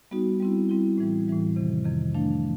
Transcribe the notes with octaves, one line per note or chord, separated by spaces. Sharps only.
G3 B3 D#4 F#4
G3 C4 E4
G3 C4 E4
A2 E3 G3
A2 E3 G3
F2 C3 D#3
F2 C3 D#3
F3 A3 D4